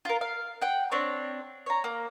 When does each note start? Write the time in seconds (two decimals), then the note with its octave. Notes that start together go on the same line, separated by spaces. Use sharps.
0.05 F4 A#4
0.21 F5
0.62 F#5 G5
0.92 C4 D4 C#5
1.66 C#5 A#5
1.84 A#3